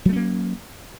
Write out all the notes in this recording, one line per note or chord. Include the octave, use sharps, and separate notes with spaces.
F#3 A3 A#3 C#4